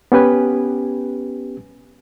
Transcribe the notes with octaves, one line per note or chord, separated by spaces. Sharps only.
B3 C#4 G4 B4 G#5